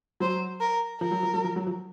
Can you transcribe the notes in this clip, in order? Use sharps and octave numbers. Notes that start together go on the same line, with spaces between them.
F#3 C5
A#4
F3 A#4
F#3
F3
F#3
F3
F#3
F3